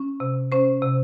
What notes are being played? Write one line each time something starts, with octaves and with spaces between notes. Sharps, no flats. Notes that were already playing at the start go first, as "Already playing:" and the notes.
Already playing: C#4
C3
C#4 C5
C3